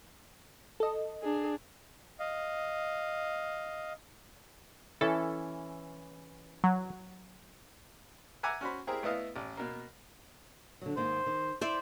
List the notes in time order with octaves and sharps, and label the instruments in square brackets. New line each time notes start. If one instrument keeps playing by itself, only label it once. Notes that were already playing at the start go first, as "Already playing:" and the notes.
[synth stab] A4 D#5
[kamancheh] D4 G#4
[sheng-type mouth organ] D#5 F5
[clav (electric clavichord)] E3 C#4 E4 [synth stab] A4
[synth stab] F#3
[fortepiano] E5 F#5 G#5 A#5 D6
C#4 F#4 C5 B5
C4 E4 G4 G#4 A#4
A3 B3 E4 D#5 F5
A1
B2 A#3
[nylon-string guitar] D3 F#3
[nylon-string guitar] G#2 D#3 A#3 [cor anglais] C5
[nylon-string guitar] D#3
[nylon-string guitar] E4 [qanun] C5 D5 E5